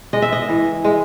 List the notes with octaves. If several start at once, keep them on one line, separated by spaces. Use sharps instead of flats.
G#3 D#5
E5
D#5
E3
G#3